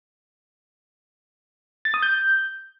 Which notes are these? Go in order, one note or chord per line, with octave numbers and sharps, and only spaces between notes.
A6
D#6
G6